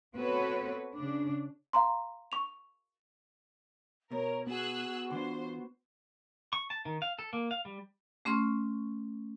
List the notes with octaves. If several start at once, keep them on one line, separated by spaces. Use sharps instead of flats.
B3 C4 F#4 A4 B4 C#5
C#3 D4
F5 A#5 C6
C#6 F7
B2 A#4 C#5
B3 F#4 G#4 E6 F#6
E3 D4 F4 C5
C#6
A5
D#3
F5
A4
A#3
F5
G3
A3 C#4 C6 C#6 F6